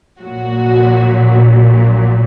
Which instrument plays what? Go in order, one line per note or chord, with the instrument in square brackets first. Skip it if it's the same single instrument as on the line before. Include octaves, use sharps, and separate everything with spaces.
[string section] A#1 A#2 F#3 F#4